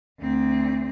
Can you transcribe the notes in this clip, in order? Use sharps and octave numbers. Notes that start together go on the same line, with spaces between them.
D2 C4